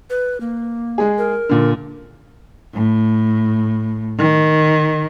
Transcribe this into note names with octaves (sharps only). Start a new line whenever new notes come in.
B4
A#3
G#3 G#4
A#4
A#2 D3
A2
D#3